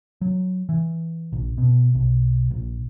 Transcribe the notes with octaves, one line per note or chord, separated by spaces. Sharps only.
F#3
E3
A#1
B2
B1
A#1